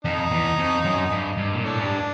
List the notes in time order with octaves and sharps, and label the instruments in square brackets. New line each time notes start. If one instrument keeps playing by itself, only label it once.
[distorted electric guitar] F2 [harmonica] D#4
[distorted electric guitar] E2
F2
F#2
G2
G2
A#2
[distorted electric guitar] A2 [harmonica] D4
[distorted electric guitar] G#2
G2